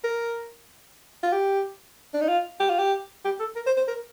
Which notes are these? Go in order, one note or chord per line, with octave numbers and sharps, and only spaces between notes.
A#4
F4
G4
D4
D#4
F4
G4
F4
G4
G4
A4
A#4
C5
C5
A#4